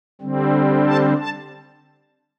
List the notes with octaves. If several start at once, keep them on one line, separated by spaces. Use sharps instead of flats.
D3 G3 C4
A5
A5